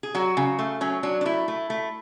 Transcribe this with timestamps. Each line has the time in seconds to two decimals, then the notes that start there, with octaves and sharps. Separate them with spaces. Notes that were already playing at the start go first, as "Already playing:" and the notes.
0.03 G#4
0.15 F#3 F#4
0.37 C#3
0.59 A3
0.81 F#3 C#4
1.03 F#3 D4
1.21 D4
1.26 A3 E4
1.48 A3
1.70 A3